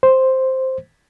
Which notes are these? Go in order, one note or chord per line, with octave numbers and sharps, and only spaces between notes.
C5